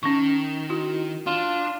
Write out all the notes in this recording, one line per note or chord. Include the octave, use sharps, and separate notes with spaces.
D#3 C#4 C#6
E4 F#4
D4 F4